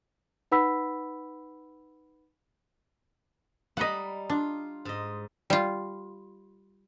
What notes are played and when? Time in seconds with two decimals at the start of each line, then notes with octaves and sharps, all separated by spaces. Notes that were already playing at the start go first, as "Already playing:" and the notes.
0.52 D#4 B4 F#5 B5 E6 B6
3.77 G3 D#4 D#5 F#5 B5
4.30 D4 F4
4.85 G#2 D#5
5.50 G3 F4